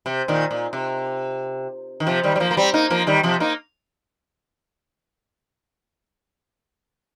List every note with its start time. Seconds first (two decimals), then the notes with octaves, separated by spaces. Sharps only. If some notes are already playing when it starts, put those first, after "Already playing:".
0.06 C3
0.28 A#2 D#3
0.51 A#2
0.73 C3
2.00 D#3
2.07 C3 F3
2.23 D#3 G3
2.36 G3
2.40 F3 A#3
2.51 A#3
2.57 G3 C4
2.74 A#3 D#4
2.90 F3 A#3
3.07 D#3 G3
3.23 C3 F3
3.40 A#3 D#4